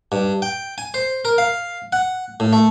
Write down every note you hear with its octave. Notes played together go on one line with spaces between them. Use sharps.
G2
G5
G#5
C5
A#4
F5
F#5
A2
A3